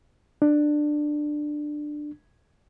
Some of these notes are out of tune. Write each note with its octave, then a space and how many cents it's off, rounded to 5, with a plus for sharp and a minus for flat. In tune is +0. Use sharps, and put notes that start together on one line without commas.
D4 +15